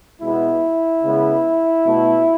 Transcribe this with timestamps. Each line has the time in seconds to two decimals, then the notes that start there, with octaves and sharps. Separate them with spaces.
0.21 B2 G#3 B3 E4
1.03 C#3 G#3 B3
1.85 B2 A3